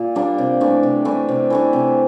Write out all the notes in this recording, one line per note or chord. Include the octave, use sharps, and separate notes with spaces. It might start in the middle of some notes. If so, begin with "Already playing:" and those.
Already playing: A#2
G3 A#3 D4
C3
E3 A3 D4
C3
E3 A3 D4
C3
E3 A3 D4
C3